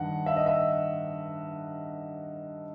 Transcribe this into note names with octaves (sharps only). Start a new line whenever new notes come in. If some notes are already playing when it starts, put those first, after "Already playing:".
Already playing: G2 D#3 F#5
E5
D#5
E5